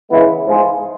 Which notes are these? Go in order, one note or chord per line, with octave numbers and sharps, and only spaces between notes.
C#3 E3 G#3 B3 E4
G#2 F3 G#3